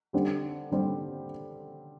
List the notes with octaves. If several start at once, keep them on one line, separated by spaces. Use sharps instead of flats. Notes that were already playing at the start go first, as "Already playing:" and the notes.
D3 G3 C4 G4
D3 G3 C4 G4